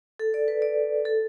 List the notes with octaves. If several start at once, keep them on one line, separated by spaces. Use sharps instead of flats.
A4
D5
B4
D5
A4